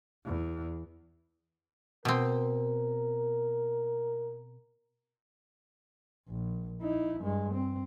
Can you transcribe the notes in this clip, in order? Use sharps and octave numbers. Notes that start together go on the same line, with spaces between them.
E2
B2 C4 A#4
A#1
D#4 E4
G2 G#3
C4